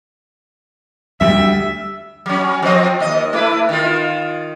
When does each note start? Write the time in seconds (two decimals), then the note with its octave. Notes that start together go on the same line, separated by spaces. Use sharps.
1.21 D2 G3 E5
2.26 F#3 C#4
2.62 F3 C4 D#5
3.00 D#2 D#5
3.33 A3 E4 B4
3.69 D#3 F4